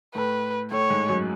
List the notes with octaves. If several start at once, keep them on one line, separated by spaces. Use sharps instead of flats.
A2 A3 B4
A2 A3 C#5
G#2 G#3
F#2 F#3